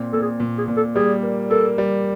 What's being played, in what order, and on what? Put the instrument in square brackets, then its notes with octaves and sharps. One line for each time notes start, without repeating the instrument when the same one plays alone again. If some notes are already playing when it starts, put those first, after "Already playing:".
Already playing: [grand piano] A#2 C4
[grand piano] A#2 [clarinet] A4
[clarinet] G#4
[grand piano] A#2
[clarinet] G#4
[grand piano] A#2
[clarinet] A4
[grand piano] G3 [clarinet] G#4
[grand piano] A#3
[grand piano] A#3 [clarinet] A4
[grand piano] G3